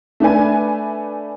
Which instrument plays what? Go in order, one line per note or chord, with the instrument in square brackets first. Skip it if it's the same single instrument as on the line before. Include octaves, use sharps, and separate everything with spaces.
[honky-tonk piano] A3 D4 B4 G#5